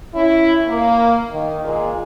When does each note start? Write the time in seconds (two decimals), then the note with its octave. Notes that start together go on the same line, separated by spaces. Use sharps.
0.15 C#4 E4
0.67 A#3
1.31 D#3
1.64 A#2 G#3